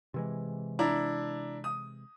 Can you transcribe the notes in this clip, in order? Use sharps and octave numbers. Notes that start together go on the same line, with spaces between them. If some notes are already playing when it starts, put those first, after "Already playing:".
C3 E3 G#3
D4 E4 A#5
D#6